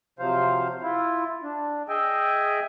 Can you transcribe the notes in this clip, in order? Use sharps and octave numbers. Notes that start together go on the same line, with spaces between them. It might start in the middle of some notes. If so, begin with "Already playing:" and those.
C3 F3 F#3 C5 F5
E4 F4
D4
G#4 D#5 E5 G5 G#5